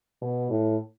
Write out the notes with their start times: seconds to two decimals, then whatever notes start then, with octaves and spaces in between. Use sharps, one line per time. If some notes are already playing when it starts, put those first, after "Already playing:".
0.22 B2
0.51 A2